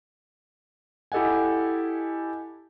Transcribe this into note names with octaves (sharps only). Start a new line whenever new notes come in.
E4 G4 A4 D#5 F#5 G#5